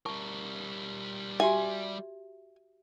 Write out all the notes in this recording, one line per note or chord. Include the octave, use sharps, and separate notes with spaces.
G3 A#4 A5 C#6
F#4 G4 E5 G#5